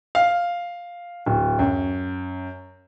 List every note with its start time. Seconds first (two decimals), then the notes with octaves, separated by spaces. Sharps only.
0.15 F5
1.26 D1
1.59 F#2